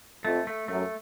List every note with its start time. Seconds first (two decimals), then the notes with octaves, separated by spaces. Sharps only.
0.24 F2 A3
0.47 A3
0.68 F#2 A3